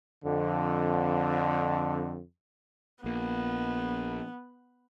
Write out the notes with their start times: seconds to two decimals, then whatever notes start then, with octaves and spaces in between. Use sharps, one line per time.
0.25 F2 D3
3.04 A#1 A#3 B3